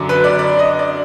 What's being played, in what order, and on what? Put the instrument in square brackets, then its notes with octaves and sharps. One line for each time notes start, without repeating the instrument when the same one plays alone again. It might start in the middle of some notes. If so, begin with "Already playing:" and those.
Already playing: [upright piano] F#2 D3 F#3 D4
B4
D5
D5
D#5
D5